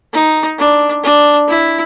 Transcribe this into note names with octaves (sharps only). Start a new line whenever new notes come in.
D#4
D4
D4
E4